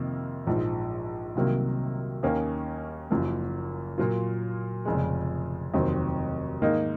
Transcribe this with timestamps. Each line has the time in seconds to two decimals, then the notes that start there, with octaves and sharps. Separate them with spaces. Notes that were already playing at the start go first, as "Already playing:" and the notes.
Already playing: F2 C3 D#3 A#3
0.47 A#1 G#2 F3
1.35 C2 C3 D#3 F#3 A#3
2.23 D#2 D#3 A#3 C#4
3.10 F#1 F#2 F3 A#3
3.98 A#2 F#3 A#3 F4
4.85 F1 F2 C#3 G#3
5.74 F1 D#2 D#3 F#3 C4
6.62 G#2 D#3 A#3 D#4